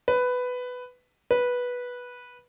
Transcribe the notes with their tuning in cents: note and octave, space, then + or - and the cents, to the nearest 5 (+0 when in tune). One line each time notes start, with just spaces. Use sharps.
B4 +10
B4 -10